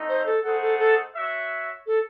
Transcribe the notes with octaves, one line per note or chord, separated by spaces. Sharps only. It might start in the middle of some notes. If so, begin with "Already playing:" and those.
Already playing: A3 C4 D#4
C5
A4
A3 D#4 G#4 A4 C5 F#5
A4
A4
F#4 C#5 E5
A4